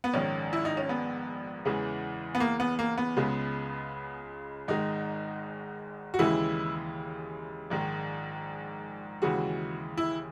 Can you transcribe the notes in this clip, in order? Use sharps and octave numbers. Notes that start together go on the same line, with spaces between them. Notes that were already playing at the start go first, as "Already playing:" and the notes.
B3
A#1 G#2 D#3 C#4
E4
D#4
C#4
B3
E2 C#3 E3 G#3
B3
A#3
B3
A#3
B3
C#2 C#3 G#3
G#1 G#2 D#3 G#3 D#4
F#4
D#2 C#3 E3 G#3 E4
A#1 G#2 D#3 G#3
D#2 C#3 E3 G#3 F#4
E4